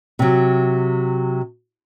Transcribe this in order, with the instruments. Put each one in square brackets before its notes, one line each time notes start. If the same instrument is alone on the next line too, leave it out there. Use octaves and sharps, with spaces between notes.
[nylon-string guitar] C3 F#3